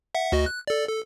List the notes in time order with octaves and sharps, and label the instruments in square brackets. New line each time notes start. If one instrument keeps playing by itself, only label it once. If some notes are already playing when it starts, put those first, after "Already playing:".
[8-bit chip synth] E5 F#5
D2 F#4 D#5
F#6
A4 D5
A4